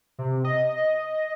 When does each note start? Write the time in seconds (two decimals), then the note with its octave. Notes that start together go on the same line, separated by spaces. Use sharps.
0.19 C3
0.45 D#5